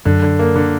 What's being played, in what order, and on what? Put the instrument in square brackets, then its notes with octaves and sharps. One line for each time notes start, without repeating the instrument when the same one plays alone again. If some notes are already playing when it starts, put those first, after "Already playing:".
[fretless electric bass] F#2 [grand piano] D3
[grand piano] D3
A#3
D3